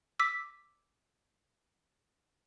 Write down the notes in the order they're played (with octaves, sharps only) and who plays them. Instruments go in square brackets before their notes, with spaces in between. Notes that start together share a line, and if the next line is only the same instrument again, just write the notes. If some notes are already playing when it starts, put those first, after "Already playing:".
[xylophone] D6 E6 B6